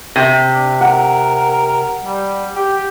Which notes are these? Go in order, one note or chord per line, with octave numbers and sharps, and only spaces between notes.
C3
D4
A#4 F#5
G3
G4